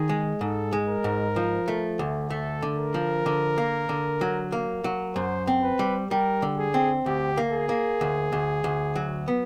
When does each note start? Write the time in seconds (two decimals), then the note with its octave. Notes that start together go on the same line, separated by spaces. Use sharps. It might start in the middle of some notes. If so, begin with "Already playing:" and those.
Already playing: D#3 G#4
0.09 G#3
0.41 G#2 A4
0.73 G#3
0.88 A#4
1.04 G#2
1.36 F3
1.68 A3
1.99 D2
2.30 A3 A4
2.62 D3
2.79 A#4
2.94 F3
3.26 D3
3.58 A#3
3.89 D3
4.21 F#3
4.52 A#3
4.84 F#3
5.15 F#2 C5
5.47 C4
5.63 B4
5.79 G3
6.11 G3 A#4
6.42 D3
6.58 G#4
6.74 C4
7.06 D2 G4
7.37 A#3
7.53 G#4
7.69 A#3
8.01 D2
8.32 D2
8.64 D2
8.96 F#3
9.28 B3